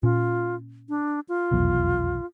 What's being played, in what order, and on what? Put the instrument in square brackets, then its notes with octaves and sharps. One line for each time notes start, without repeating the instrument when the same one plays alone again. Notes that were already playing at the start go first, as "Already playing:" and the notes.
[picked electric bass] A#2 C#4 [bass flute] F4
[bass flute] D4
F4
[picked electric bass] F1 B1 E2